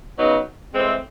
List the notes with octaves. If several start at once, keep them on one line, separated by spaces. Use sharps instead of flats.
C#3 F#3 B3 D#4
A2 E3 G#3 C4